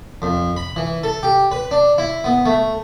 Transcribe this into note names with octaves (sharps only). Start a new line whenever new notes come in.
F2
B5
E3
A4
G4
B4
D4
E4
B3
A3